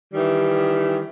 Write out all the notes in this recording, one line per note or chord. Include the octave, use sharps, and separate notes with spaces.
D#3 E3 G3